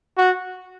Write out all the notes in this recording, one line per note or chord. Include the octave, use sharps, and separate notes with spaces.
F#4